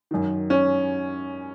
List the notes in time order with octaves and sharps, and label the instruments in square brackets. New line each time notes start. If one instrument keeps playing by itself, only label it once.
[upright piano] F#2 D#3
C#4